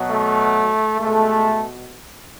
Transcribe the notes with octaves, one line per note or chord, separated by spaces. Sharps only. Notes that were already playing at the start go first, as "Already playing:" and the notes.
Already playing: B2 F#3
A3
B2 G#3 A3